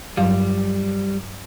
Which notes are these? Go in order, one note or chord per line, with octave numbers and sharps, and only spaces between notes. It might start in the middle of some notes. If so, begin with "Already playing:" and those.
G2 F#3 G3 F5